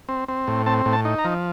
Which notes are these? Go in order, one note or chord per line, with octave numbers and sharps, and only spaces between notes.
C4
C4
A2
C4 A5
A2
A5
D#4
A#5
F3